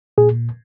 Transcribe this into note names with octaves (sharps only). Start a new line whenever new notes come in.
A#2 G#4